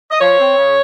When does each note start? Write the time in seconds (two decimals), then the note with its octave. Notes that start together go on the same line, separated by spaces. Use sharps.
0.11 D#5
0.19 F3 C#5
0.38 C4
0.57 C#3